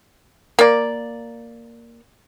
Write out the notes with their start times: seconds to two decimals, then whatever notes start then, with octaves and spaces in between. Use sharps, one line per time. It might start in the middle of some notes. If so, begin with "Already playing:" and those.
0.59 A#3 D5